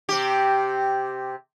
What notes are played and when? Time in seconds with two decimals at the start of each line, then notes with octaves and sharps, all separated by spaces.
0.09 C3 G4